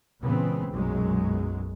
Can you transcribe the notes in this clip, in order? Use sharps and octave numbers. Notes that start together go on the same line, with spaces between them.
A#2 C#3 E3 G#3 B3 C4
B1 F#2 A#2 F#3 G#3